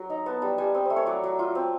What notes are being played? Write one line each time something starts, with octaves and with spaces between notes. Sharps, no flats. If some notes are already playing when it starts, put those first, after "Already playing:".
Already playing: F#3
D#4 A#5
B3 A5
G3 A5
G3 G#5
C4
A3 C5
C#5
F#3 D5
F#3
F4
C4